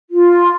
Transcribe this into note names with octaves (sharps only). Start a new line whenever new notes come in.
F4